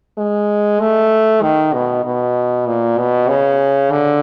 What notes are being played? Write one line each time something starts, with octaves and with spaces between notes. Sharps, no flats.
G#3
A3
D#3
B2
B2
A#2
B2
C#3
D3